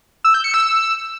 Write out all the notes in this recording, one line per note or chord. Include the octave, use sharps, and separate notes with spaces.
E6
G6
C#7
E6